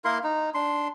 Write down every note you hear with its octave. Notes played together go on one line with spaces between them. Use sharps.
A#3 E4 A#4 C6
D#4
D4 C6